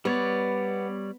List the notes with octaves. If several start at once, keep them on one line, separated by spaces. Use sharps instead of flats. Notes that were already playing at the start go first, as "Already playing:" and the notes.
G3 B3 C#5 D5